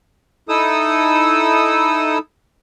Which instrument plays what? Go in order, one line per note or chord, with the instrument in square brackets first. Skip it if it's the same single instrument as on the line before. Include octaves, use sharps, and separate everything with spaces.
[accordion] D#4 E4 A4 D#6 E6